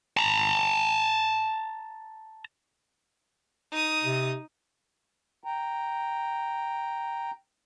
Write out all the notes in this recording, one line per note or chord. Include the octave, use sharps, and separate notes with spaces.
A5 A#5
D#4 D#6
C3
G5 A#5